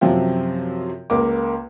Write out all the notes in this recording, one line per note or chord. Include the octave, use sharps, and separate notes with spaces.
F#2 C3 F3 C4 F4
C#2 A#3 D6